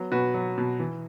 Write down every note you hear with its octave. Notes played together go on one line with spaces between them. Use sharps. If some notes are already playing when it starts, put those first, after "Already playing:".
Already playing: F#3 B3
B2 F#4 B4
F#3
B2
E3